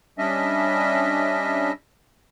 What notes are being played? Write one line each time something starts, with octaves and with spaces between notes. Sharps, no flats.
G3 C#4 D4 D#5 E5